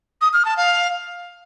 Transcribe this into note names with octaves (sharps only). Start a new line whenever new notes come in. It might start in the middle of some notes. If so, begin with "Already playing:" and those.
D#6
F6
A5
F5